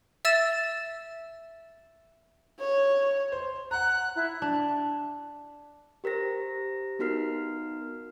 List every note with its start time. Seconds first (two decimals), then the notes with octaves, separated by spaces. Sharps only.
0.25 E5 E6 A6 E7
2.59 C#5
3.32 C5
3.71 F#5 A#5 F#6
4.16 E4
4.42 D4
6.04 G4 A#4 C5 A#6
6.99 B3 D#4 F#4 A#4 F6 C7